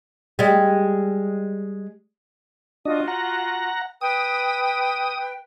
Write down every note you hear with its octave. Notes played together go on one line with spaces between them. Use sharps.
G3 G#3
D4 F4 F#4 D#5
F#5 A#5
B4 G5 D#6